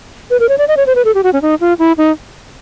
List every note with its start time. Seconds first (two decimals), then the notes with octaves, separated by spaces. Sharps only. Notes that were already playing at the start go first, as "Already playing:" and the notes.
0.30 B4
0.40 A#4
0.49 C#5
0.58 D5
0.68 D#5
0.77 C#5
0.87 C5
0.95 B4
1.05 A4
1.15 G4
1.23 F#4
1.33 C#4
1.42 D#4
1.61 F4
1.79 E4
1.98 D#4